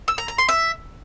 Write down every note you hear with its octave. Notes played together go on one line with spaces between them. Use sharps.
E6
A#5
A#5
C6
E5